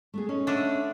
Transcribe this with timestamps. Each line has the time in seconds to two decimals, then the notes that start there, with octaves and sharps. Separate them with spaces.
0.14 A3 B3 G#4
0.29 C#4 D#4
0.47 D3 A3 D4